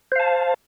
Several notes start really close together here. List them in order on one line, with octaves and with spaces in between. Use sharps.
C5 F5 A5